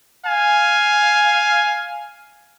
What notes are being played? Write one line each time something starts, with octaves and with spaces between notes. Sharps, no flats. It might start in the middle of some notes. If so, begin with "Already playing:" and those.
F5 G#5